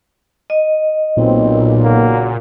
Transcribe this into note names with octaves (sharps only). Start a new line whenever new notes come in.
D#5
B1 A#2 C4
C#3 A#3 F#4